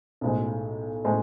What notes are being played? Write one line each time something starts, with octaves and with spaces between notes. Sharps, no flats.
B1 A2 G#3
A2 G#3